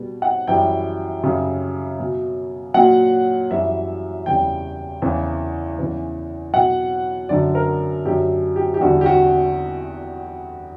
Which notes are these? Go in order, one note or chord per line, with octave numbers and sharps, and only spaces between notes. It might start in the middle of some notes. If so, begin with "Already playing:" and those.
Already playing: B2 G3
F#5
F#2 E3 G3 G5
F#2 C#3 G3
B2 F#3
A#2 F#3 F#5
F#2 E3 G3 E5
E2 C#3 G3 G5
E2 C#3 E3
E2 C#3 E3
B2 F#3 F#5
F#2 D3 F#3 D5
A#4
F#2 D3 F#3 G4
G4
G4
E2 D3 G3 F#4
G4
F#4